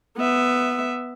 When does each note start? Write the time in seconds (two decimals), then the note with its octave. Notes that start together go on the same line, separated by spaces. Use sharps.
0.17 B3 E5